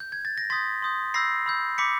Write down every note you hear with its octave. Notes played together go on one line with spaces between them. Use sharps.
G6
G#6
A6
A#6
C6 D#6 G6 A6 B6
C6 D#6 G6
B5 E6 G6 A#6 C7
B5 E6 G6
B5 D6 G6 B6 C#7